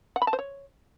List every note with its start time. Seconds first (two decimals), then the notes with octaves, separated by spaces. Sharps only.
0.16 F#5
0.22 B5
0.27 A5
0.33 C5
0.39 C#5